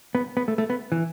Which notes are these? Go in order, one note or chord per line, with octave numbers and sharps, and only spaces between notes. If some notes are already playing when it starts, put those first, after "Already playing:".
B3
B3
A3
A3
B3
E3